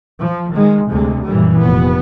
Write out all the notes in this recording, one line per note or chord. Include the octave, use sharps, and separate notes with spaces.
F3
D#3 G#3
D2 C3 G#3
F#2 A#2 E3 G3
F1 B3